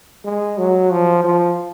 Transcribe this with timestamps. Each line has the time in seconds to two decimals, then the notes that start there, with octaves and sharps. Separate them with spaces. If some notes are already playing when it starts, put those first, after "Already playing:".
0.25 G#3
0.58 F#3
0.91 F3
1.24 F3